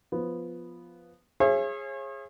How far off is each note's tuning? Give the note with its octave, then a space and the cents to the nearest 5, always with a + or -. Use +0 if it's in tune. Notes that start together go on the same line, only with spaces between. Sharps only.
F3 +0 B3 +0
G#4 +0 C#5 -40 E5 +40